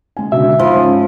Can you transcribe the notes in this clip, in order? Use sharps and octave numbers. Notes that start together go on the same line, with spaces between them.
G#3 G#5
B2 D3 E5
G#2 F3 B5
G#2 C#4